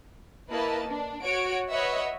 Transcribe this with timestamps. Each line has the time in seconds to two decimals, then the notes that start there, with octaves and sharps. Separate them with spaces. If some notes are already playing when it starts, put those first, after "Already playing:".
0.50 A#3 E4 B4 D#5 A5
0.89 D4
1.22 F#4 C#5 D7
1.70 B4 C#5 D#5 E5 F#5